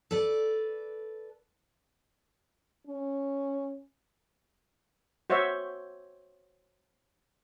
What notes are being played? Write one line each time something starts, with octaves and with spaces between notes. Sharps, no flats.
A4 B4 D5
C#4
F#4 C5 C#5 E5